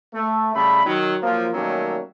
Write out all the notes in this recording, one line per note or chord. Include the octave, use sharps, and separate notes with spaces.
A3
C#3 G3 A3 B5
D#3 F#3
F3 F#3 A#3
D#3 F#3 G3 A3 A#3 C#4